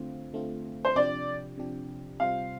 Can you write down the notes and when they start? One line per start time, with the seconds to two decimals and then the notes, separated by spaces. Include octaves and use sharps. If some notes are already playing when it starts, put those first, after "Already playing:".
Already playing: D3 A3 C4 F4
0.34 D3 A3 C4 F4
0.85 C5
0.96 C3 F3 D4 G4 D5
1.57 C3 F3 D4 G4
2.20 C3 G3 F4 C5 F5